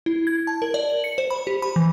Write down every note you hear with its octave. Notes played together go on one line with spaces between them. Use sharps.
E4
G#6
A5
A#4
D5
F#7
C#7
C5
B5
G4
B5
E3